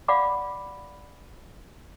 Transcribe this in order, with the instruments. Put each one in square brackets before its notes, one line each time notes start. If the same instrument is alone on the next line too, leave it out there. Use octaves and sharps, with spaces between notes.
[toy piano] D5 F5 F#5 B5 D6